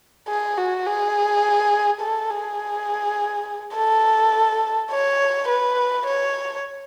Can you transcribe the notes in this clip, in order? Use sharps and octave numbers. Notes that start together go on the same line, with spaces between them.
G#4
F#4
G#4
A4
G#4
A4
C#5
B4
C#5